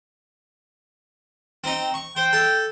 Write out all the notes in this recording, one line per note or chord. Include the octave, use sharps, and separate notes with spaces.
C4 D#4
C#6
C5 G5
A4